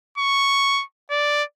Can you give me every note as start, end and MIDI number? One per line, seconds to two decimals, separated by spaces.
0.18 0.83 85
1.10 1.43 74